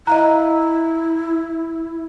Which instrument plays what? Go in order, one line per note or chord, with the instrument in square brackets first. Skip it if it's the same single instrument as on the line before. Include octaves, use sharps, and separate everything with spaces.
[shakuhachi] E4 [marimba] D#5 F5 F#6 [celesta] A#5